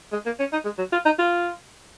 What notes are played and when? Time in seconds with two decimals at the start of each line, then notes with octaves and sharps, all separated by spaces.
0.13 G#3
0.26 A#3
0.40 C#4
0.53 D#4
0.65 G#3
0.78 F#3
0.92 F4
1.05 D#4
1.19 F4